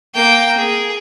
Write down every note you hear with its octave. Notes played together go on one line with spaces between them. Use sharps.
A#3 G5
G#4